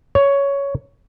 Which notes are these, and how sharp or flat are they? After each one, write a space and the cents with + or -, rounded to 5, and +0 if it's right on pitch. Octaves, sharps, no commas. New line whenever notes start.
C#5 +10